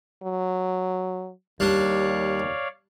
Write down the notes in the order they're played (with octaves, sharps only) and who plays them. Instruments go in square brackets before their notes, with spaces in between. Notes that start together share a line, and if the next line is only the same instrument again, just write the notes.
[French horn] F#3
[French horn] D#2 [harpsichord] G3 D4 [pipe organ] C#5 D5 F5